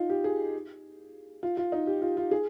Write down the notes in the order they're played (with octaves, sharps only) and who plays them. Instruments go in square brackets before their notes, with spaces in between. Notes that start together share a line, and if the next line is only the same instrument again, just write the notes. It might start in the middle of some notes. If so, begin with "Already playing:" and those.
Already playing: [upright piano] D#4 F4
G4
G#4
F4
F4
D#4
G4
F4
F4
G#4